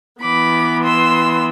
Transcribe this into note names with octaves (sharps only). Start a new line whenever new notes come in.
E3 B3 B5 D6
C6 E6